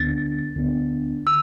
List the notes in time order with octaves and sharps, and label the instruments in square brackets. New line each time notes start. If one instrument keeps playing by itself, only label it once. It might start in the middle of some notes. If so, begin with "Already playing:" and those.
Already playing: [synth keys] D2 D3 B3 D4 [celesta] A6
[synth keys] D2 D3 B3 D4
[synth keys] D3 [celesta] E6